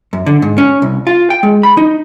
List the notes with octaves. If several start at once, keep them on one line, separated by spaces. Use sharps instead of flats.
F#2
D3
G#2
C#4
C2
F4
G5
G#3
B5
D#4